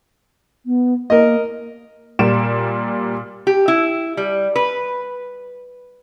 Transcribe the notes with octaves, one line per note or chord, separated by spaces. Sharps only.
B3
A#3 A#4 D#5
A#2 G3 D7 E7
G4
E4
G3
B4